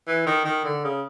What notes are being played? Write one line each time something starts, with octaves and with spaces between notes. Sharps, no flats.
E3
D#3
D#3
D3
C#3